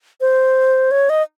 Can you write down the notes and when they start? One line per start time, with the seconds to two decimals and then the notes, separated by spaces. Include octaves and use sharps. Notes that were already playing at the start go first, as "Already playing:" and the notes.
0.21 C5
0.91 C#5
1.10 D#5